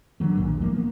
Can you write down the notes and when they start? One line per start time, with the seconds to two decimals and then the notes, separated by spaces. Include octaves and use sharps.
0.20 D3 E3 F#3 A3
0.37 A#1 D#2 A#2
0.61 F3 A3 A#3
0.73 A#3 B3